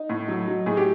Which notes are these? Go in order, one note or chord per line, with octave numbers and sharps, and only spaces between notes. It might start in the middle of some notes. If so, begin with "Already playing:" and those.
Already playing: D#4
A2
F#3
F#3
A2 G#4
G4